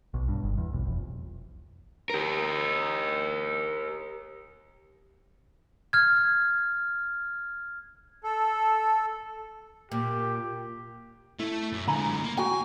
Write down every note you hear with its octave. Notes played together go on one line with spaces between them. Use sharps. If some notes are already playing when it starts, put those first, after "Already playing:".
B1
G2
G1
E2
B1
F1
G4 A#4
F6 G#6
A4
A#2 G4
A3 E4 A4
F#2
D3 G#3 G#5 A#5 B5
A#3
F#4 G5 G#5